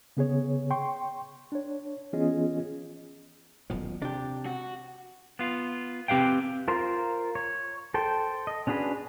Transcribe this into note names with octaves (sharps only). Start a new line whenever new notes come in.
C#3 B3 G#4 C#5
G5 C6 C#6
D4 C#5
E3 B3 C#4 F4 G#4 D#5
D#1 B1 F3
C3 D4 G4
F#4
B3 F4
C4 G4 B4 F5 G5
F4 A#4 C5
C#5
A4 C5 G5
D#5
C#4 D4 F#4 G#4 B4